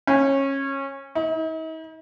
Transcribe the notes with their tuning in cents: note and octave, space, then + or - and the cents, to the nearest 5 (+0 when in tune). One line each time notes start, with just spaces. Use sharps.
C#4 -20
D#4 +45